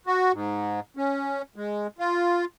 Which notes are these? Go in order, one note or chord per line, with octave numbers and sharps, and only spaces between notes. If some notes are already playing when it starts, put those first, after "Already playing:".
F#4
G#2
C#4
G#3
F4